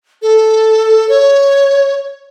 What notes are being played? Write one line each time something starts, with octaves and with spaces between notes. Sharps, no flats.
A4
C#5